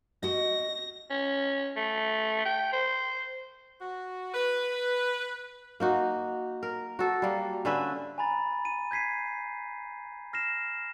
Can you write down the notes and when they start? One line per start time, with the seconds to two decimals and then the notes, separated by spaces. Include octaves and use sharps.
0.23 F#4 D#5 A#6
1.10 C#4
1.76 A3
2.45 G5
2.72 C5
3.81 F#4
4.34 B4
5.80 A#3 D#4 F#4
6.63 A#4
6.99 F#4 A4
7.22 G3 A#3
7.65 D3 C#4 B4 E5
8.18 G#5 A#5 B5 A6
8.65 D#7
8.91 G6 G#6 B6 C7 D#7
10.33 F6 A#6 C7 E7